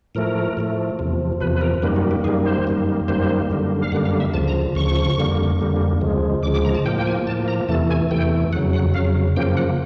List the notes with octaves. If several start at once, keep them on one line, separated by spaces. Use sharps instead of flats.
A2 F3 A3 A#4
A2 F3 A3
E2 C3 F3
E2 C3 F3 B4
B4
A#4
F#2 D#3 G3 A#3 B4
F#4
G4
F#2 D#3 G3 A#3 G#4
C5
F#2 D#3 G3 A#3
F#2 D#3 G3 A#3 C5
F#2 D3 G3 A#3
F5
F#2 D3 G3 A#3 F#5
F5
E5
D2 C#3 F3 A5
A#5
D2 C#3 F3 C#6
F2 D3 G3 A#3
F2 D3 G3 A#3
D2 C#3 F3 G#3
D2 C#3 F3 G#3 D6
D6
A#5
A5
A2 F3 A#3 G5
G5
G#5
A2 F3 A#3 A5
A#5
E2 C3 E3 A3 A5
G#5
E2 C3 E3 A3 G5
F2 C#3 F#3 F#5
F#5
F2 C#3 F#3 F5
F#2 C#3 F3 A#3 G5
F#5